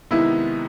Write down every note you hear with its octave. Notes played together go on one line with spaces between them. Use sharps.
C3 D#3 G#3 B3 D#4 E4